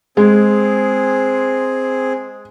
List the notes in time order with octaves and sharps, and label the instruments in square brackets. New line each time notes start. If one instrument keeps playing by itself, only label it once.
[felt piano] G#3 [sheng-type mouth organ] C4 G#4